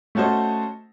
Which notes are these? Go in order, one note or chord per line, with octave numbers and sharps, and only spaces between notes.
A3 C#4 F#4 A4 C5 D#5